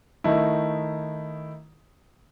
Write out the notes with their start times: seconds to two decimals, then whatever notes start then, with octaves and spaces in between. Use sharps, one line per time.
0.24 D#3 A3 D#4 E4